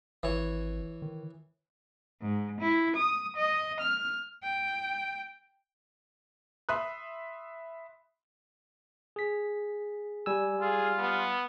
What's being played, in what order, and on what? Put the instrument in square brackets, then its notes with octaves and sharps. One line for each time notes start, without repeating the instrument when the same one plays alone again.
[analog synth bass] G#1 [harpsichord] E3 C#5
[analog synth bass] D#3
[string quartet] G#2
E4
D#6
D#5
F6
[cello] G5
[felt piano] E5 B5 C6 D#6 F#6
[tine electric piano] G#4 B6
G3 G#5 E6
[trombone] F4 [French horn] G#4
[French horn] B3